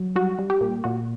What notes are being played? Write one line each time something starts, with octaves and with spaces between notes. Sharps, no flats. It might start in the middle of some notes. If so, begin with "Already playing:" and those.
Already playing: F#3
G3 F#4
G3
G4
A#2
A#2 F#4